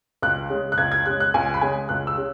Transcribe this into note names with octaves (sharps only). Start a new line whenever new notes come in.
C#2 F#6
C#3 G#3
F#6
C#2 G#6
G#6
C#3 G#3 F#6
F#6
C#2 G#5
B5
C#3 G#3 G#5
C#2 F#6
E6
C#3